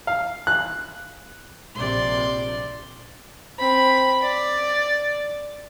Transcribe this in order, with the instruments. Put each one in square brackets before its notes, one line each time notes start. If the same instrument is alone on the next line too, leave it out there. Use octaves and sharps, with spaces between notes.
[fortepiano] F5
F#6
[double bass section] A#1 C3 [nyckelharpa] D5 C6
[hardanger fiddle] C4 B5
D5